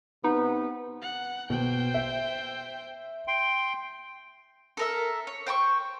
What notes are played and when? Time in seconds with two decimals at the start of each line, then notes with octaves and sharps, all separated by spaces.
0.24 C3 B3 D#4
1.02 F#5
1.50 B2 C5 G5
1.94 E5
3.28 G5 C6
4.77 A4 A#4 E5
5.27 C#5
5.47 C5 G5 A#5 C#6